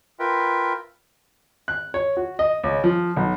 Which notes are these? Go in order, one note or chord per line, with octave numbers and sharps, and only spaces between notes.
F4 A#4 B4 E5 G5
F#6
C#5
F#4
D#5
C#2
F3
B1